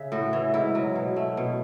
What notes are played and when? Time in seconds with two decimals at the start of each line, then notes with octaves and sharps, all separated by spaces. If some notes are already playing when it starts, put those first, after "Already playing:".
Already playing: C#3 E5
0.12 A2 F#4
0.33 E3
0.54 G#2 E4
0.75 F#3
0.95 B2
1.16 A3
1.37 B2